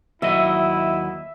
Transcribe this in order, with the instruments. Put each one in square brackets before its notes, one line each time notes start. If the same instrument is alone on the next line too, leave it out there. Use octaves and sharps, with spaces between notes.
[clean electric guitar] D#2 F#3 D#5 [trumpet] E4 [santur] E5